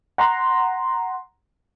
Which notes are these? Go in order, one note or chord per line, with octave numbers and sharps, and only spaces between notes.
F#5 A#5 C6